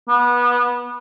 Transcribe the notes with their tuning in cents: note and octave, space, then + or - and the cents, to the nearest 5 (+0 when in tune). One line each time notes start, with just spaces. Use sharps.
B3 -25